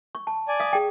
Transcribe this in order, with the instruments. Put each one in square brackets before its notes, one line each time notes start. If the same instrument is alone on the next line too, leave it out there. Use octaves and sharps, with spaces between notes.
[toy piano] C#6
A5
[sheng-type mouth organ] D5 G#5
[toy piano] F5 D#6
G#4 G5